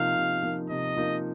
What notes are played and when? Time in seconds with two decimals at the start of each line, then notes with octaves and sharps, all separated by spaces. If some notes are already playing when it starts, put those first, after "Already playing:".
Already playing: C3 F3 A#3 D#4 F5
0.16 C3
0.43 F3 A#3 D#4
0.69 C3 D#5
0.96 F3 A#3 D#4